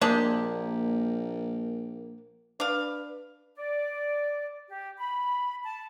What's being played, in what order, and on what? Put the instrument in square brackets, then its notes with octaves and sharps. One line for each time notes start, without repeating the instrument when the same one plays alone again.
[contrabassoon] A#1 [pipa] G#3 D4 G4 [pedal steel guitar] A#3
[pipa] D4 F5 [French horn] B4
[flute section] D5
G4
B5
A5